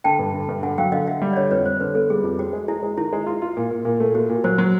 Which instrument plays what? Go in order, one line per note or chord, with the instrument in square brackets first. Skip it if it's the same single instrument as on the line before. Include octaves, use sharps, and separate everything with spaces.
[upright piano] D3 [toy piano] G5 A5
[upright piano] G2
D3
G2
[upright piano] D3 [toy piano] F#5 G#5
[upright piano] F#3 [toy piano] F5 G5
[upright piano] D3 [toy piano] D#5 F5
[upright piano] D3 [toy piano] E5 F#5
[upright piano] G3
[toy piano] D5
[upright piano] D3 [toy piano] C#5 D#5
[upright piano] F2 [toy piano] B4 C#5
[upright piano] G3 [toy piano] C5
[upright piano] D3 [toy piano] B4
[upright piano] B3 [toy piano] A4
[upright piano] G3 [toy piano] G#4
[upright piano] F2
[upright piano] C4 [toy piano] F#4
[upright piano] G#3
[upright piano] G#3 [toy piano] E4
[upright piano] G#3
[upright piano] D#3 [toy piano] E4
[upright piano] G#3
F4
F4
A#2
A#2
A#2
A3
[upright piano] A#2 [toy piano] F#4
[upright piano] A#2
[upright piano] F#3 [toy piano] C5
[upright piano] F#3